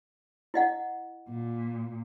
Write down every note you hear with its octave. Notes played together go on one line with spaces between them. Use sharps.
E4 D#5 F#5
A#2